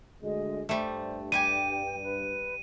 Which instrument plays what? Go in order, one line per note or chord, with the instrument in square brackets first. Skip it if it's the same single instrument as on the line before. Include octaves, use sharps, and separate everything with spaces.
[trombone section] D2 D3 G#3 [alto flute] D#5
[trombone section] G2 [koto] G3 A3 [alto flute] C5
[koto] G3 G4 G#5 [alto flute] G5 [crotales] D#7
[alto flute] B4